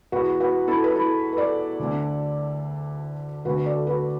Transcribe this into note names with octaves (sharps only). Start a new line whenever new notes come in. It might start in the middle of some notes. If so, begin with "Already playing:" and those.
E2 E3 F#4 B4
F#4 B4
E4 A4
B4
E4 A4
B4
A4 D5
D2 D3
D2 D3 F#4 B4
A4 D5
F#4 B4